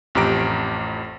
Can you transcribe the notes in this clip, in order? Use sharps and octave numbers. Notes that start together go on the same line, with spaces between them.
A1 F2 G4 A#5 D7